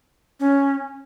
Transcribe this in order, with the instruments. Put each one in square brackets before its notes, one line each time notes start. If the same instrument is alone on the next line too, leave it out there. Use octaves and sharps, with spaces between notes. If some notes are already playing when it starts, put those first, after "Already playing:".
[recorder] C#4